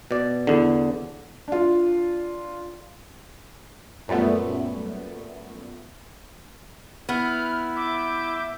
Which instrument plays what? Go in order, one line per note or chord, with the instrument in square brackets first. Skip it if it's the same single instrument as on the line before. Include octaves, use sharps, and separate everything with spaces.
[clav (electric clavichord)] B2 D5
E2 D3
[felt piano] D4 F4
[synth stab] F#2 A#2 G3 A3 B3
[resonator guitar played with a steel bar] B3 [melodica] E4 [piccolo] F6
[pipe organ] E5 G6 [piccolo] D6